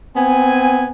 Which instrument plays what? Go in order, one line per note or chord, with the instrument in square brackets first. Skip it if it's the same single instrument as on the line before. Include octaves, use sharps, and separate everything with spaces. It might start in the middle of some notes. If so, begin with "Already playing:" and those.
[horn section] B3 C4 G#5